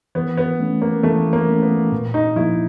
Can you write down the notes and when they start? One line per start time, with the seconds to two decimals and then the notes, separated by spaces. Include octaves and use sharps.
0.15 E3 B3
0.37 B3
0.60 A3 C#4
0.82 A#3
1.03 E3 A3
1.33 A#3
1.48 A3 C#4
1.62 B3
1.92 A#2
2.14 D#4
2.36 F3 A#3 E4